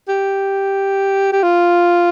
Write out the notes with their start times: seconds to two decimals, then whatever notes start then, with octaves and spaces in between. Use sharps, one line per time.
0.08 G4
1.32 G4
1.43 F4